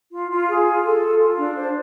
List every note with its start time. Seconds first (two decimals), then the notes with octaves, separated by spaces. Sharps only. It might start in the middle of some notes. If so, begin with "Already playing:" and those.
0.13 F4
0.31 F4
0.49 G#4
0.66 F4
0.84 A4
1.02 F4
1.19 F4
1.37 D4
1.55 C5